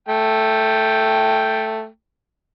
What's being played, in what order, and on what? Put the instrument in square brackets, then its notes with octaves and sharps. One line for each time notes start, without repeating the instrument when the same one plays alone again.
[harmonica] A3 G5